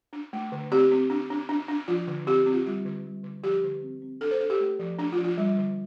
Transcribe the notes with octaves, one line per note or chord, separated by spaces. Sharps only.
D4
A3
D3
C4 G4
C4
D4
D4
D4
D4
F3 F4
D3
C4 G4
C4
F4
G3 F4
D3
G3
D3
F3 G4
D3
C4
C4
D4 A4
C5
D4 A4
G4
A3
F3
A3 D4
F4
F3
F4
G3
D3